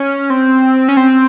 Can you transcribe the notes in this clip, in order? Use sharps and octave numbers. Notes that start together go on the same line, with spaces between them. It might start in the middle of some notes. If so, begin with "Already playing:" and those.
Already playing: C#4
C4
C#4
C4